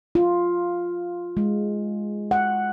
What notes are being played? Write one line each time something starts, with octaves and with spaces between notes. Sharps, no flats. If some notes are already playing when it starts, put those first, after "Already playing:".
F4
G#3
F#5